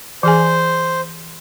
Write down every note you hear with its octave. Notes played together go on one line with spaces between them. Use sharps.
E3 G#4 C5 G#5